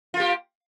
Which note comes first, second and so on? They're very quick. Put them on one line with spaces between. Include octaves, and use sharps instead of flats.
F4 A#3 G4